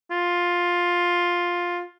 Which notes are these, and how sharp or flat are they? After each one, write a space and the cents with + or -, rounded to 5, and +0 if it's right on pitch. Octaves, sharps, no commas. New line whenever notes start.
F4 +10